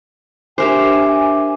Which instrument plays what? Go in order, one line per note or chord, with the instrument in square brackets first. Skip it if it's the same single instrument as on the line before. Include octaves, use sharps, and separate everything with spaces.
[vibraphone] D4 E5 D6 [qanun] G4 A#4 C5 [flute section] G#5